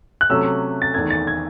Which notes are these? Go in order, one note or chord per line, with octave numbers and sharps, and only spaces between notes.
F#6
C3 F#3 A3 C#4 E6
A6
E2 D#3 A3 G#6
A6
G#6